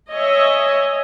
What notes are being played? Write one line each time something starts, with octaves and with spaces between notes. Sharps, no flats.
C#5 D#5 E5 G#5